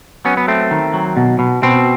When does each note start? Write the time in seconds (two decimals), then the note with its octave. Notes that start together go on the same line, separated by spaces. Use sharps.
0.25 F#3 B3 C#4
0.37 B3
0.48 A3 C4
0.71 D#3
0.94 F#3
1.17 B2
1.39 B2
1.63 B2 C4